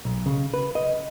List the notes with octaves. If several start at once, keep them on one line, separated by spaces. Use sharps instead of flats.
B1
C#3
B4
D#5